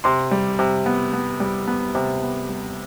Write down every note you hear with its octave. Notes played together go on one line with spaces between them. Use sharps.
C3 C6
G3
C3
B3
B3
G3
B3
C3
B3
G3